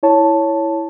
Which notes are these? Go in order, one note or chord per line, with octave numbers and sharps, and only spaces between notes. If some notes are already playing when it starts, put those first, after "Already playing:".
E4 C#5 A5